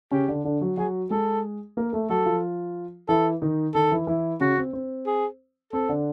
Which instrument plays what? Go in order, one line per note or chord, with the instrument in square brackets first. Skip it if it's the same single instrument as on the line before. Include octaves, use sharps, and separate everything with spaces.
[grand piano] C#3 C#4 [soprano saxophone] G4
[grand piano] D3 D4
D3 D4
F#3 F#4
[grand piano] F#3 F#4 [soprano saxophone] G#4
[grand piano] G#3 G#4 [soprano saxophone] A4
[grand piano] A#3 A#4
A3 A4
[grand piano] F#3 F#4 [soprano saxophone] A4
[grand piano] F3 F4
[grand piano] E3 E4 [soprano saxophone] A4
[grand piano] D#3 D#4
[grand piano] D#3 D#4 [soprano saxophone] A4
[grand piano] E3 E4
E3 E4
[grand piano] C#3 C#4 [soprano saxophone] F#4
[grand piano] C4
C4
[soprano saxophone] G#4
[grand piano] C4 [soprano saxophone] A4
[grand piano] D3 D4